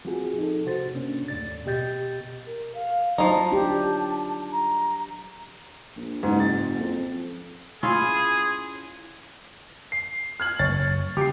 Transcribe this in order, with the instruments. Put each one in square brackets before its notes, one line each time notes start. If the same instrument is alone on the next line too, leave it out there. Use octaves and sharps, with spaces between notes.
[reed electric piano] F3 C4 F#4 G#4
D#4 A4
C3 F#4 C5 A6
C3 A#3 C#4 D4
D#2 A2 D5 A6
B2 G4 D#5 G6 A6
[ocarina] A#4
F5
[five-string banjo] F3 D#4 [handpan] F#3 [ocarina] A5
[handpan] D4 G4 [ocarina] A5
[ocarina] A#5
[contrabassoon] A#1
[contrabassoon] F#1 [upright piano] G#2
[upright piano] A6
[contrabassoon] F2
[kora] C#4 E4 F4 [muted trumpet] G#4
[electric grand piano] C7
[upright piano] F6 G#6 F#7
[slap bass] F#1 [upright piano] C#5 [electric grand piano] A6
[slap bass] C#3 [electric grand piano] G4 [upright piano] D6 C7